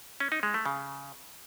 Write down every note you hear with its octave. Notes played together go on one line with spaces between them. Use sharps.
C#4
D#4
G#3
A3
C#3